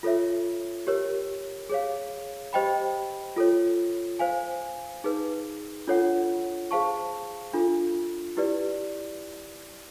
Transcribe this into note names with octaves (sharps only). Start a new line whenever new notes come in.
F4 A4 C#5 E5
G4 A#4 C#5
G#4 C#5 F5
G4 C5 D#5 G5 B5
F4 A4 C#5
C5 F5 G#5
D#4 G#4 B4
D4 F4 A4 C#5 F#5
G#4 C5 F5 A5 C#6
D4 F4 A4
E4 G4 B4 D5